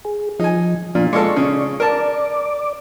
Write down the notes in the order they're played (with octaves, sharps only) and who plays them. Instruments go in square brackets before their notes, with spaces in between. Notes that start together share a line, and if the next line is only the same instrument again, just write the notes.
[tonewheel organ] G#4
[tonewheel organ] F3 [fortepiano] D#4 G#5
[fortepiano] A#2 [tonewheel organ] F3 D4 F4
[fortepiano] G#3 F4 A4 [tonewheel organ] D5 C#6
[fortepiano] C#3
[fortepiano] A#4 A5 [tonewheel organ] D5 D6